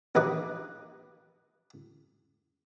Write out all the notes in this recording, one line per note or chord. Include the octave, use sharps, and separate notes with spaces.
A#1 D#2 D#4 B4 D6